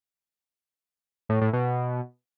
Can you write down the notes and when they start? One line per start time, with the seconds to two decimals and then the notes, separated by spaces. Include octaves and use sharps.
1.29 A2
1.41 A2
1.53 B2